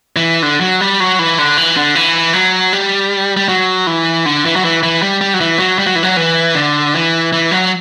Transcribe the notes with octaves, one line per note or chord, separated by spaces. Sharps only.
E3
D3
F#3
G3
F#3
E3
D3
E3
D3
E3
F#3
G3
G3
F#3
E3
D3
E3
F#3
E3
E3
G3
G3
F#3
E3
F#3
G3
F#3
E3
F#3
E3
D3
E3
E3
F#3